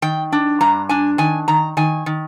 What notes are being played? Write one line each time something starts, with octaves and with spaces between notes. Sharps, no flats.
D#3 G5
D4
G2 A#5
D4 G#5
D#3 G#5
D#3 A#5
D#3 G#5
D#3